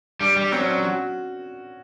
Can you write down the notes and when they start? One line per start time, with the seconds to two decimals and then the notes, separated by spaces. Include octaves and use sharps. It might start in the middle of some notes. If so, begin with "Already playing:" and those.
0.20 G3 D4
0.36 G3
0.52 F#3 C4
0.60 C#4
0.68 D4
0.83 F#4